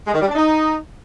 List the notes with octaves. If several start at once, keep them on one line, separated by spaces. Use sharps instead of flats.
G#3
D#3
G3
D4
D#4